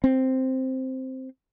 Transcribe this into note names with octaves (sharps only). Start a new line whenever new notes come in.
C4